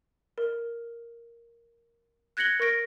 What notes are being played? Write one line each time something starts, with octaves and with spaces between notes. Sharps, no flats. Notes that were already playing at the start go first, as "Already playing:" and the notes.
A#4
F#6 G#6 A#6 C#7 F#7 G7
A#4 C#6 A#6 D7